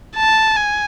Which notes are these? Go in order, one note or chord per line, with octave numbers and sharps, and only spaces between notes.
A5
G#5